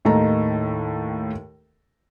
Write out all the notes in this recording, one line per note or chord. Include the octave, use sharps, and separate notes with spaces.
D#2 A2 D#3 A4 A#5